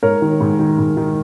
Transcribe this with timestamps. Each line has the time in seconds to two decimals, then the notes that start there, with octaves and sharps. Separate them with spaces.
0.03 G#2 A#4 C#5
0.22 D#3
0.41 G#2
0.59 D#3
0.78 G#2
0.97 D#3